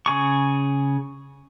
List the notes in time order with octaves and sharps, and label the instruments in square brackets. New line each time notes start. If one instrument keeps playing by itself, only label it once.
[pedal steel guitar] C#3 G#4 C#6